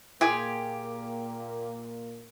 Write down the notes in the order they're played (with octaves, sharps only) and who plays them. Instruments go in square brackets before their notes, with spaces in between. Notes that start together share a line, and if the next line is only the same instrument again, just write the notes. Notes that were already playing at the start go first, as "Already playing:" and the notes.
[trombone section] A#2 A#3 [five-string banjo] F4 G#4 G#5 [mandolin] G4